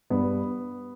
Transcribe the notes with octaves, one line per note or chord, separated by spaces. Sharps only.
G2 B3